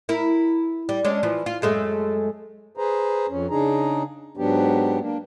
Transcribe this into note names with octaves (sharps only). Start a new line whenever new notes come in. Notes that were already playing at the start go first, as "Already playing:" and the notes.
E4 A#4
G3
G#3 C#4 D4
E3 F3
F4
F#2 G#3 A3
G#4 B4 C5 A#5
F2 C#4
C#3 D4 D#4 G#4 A#5
G#2 F#3 B3 D4 G4
A#3 D4